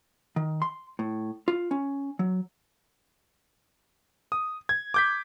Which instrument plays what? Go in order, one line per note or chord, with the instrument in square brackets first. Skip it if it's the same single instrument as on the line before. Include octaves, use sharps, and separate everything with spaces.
[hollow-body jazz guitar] D#3
C6
A2
F4
C#4
F#3
[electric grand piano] D#6
G#6
D6 G6 B6